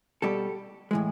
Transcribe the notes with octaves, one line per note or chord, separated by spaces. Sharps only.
B2 G3 G4 A4
A2 E3 G#3